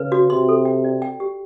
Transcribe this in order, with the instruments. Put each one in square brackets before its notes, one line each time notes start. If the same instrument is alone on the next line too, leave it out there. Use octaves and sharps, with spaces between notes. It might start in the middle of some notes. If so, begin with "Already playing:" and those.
Already playing: [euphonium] C#3 [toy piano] B4
[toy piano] F#4
[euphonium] C3 [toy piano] C6
[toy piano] A4
G5
D5
G5
G4